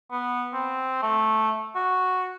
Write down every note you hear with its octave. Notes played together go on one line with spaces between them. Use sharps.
B3
C4
A3
F#4